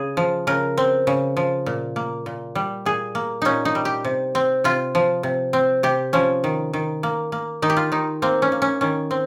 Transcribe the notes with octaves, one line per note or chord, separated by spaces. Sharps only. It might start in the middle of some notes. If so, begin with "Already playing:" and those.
Already playing: C#3 G#4
F3
C#3 A#4
C4
C#3
F3
A#2
A#3
A#2
G3
A#2 G#4
A#3
A#2 C#4 D#4
D#4
G3
G4
C3
C4
C3 F4
F3
C3
C4
C3 G4
F3 C#4
D#3
D#3
A#3
A#3
D#3 D#4
G4
F4
D#3 D#4
A#3 C4
C#4
A#3
C#4
D#3 C#4
C4